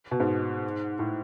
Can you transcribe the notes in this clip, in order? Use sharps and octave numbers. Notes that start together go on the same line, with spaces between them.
B2
G#2
A2